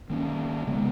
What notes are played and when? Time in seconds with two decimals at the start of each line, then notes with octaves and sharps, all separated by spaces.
0.10 D#3 A#3 C#4
0.67 C#3 G#3 B3